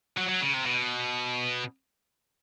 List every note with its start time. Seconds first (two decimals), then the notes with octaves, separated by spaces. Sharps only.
0.18 F#3
0.29 F#3
0.41 C#3
0.54 C3
0.66 B2